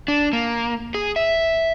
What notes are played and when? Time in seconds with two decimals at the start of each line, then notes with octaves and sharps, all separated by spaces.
0.08 D4
0.33 A#3
0.94 G#4
1.16 E5